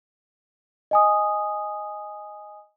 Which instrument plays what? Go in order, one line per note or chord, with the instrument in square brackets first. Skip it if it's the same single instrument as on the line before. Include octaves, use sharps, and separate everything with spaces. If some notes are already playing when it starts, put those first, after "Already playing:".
[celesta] D#5 G#5 D#6